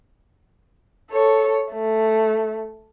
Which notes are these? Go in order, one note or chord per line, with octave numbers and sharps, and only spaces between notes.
A4 C#5
A3